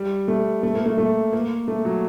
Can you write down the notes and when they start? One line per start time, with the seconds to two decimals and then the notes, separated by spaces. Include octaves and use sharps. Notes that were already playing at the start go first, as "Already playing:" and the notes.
Already playing: G3
0.28 A3
0.63 A3
0.75 A#3
0.86 A3
0.98 A3
1.33 A#3
1.68 A3
1.85 F#3